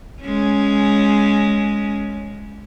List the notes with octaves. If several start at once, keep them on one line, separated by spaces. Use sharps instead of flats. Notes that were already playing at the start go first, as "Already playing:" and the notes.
G#3 C#4